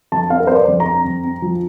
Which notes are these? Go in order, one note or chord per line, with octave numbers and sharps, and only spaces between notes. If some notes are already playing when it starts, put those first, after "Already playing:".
F2 A5
C4 F5
A#4
C4 C5
D5
F2
A#5
C4
F2
C4
F3